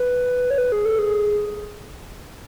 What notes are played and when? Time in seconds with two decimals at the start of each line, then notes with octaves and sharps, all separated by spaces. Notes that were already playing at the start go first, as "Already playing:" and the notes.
Already playing: B4
0.50 C#5
0.58 B4
0.72 G#4
0.85 A4
0.99 G#4